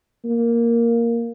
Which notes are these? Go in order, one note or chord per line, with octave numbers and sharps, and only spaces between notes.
A#3